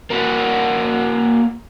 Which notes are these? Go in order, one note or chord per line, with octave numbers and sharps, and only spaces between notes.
A#3 F#4